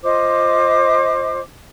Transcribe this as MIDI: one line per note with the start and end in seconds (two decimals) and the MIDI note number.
0.03 1.40 65
0.03 1.40 72
0.03 1.40 75
0.03 1.40 86